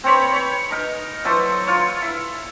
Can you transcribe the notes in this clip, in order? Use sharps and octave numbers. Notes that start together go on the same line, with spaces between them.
C4 C5 C#5 B5
C#5 B5
D#4 A#4
F#3 E4 A4 C5
F4 C#5
E4